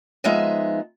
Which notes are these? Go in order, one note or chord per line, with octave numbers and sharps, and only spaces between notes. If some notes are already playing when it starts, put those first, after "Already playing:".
F3 G#3 B3 D#4 E5